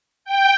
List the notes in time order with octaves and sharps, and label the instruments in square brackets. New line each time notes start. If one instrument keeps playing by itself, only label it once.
[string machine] G5